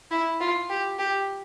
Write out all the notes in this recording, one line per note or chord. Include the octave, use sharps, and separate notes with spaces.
E4
F4
G4
G4